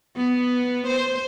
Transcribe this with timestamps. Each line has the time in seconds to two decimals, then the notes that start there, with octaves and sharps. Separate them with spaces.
0.17 B3
0.87 C5